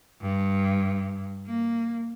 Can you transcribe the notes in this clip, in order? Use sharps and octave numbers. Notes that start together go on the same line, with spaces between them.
G2
A#3